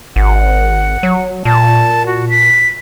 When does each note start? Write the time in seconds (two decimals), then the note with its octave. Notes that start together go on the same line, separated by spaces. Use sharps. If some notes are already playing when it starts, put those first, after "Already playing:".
0.16 G#1 F#5
1.03 F#3
1.45 A#2 A5
2.06 F#4
2.30 B6